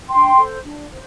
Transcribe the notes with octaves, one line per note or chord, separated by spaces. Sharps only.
D4 G5 C6
A4 C5
D4
C5